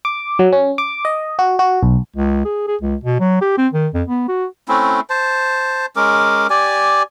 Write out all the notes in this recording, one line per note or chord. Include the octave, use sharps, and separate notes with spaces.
D6
F#3
C#4
D6
D#5
F#4
F#4
B1
C#2
G#4
G#4
C#2
B2
F#3
G4
C4
D#3
F2
B3
F#4
A3 C4 C#4 E4
C5 A5
G#3 C#4 A#4 D6
G4 D5 G#5